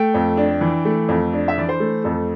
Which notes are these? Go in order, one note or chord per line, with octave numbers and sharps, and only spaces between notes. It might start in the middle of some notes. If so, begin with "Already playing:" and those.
Already playing: A3 G5
F2
D4
E3
A3
F2
D4
E5
E3 D5
C5
A3
F2 A4